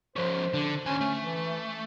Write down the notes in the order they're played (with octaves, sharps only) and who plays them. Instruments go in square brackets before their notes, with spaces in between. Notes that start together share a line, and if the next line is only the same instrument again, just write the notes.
[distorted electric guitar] F3 C#4 [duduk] C5
[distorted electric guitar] D3
[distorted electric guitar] D#2 G#5 [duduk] C#4
[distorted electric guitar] A3
[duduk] E3